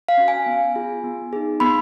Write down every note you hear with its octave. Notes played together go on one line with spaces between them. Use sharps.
F5
C#4 F#4
G#5
B3
F4 G#4
B3
D#4 G#4
B3 B5